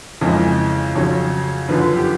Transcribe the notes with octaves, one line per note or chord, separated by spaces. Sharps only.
F2 C#3 E3 G#3
F2 C#3 F#3 C#5
F#2 D3 F3 B4
G4